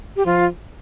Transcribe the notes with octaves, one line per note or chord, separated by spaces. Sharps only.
G4
F3 F4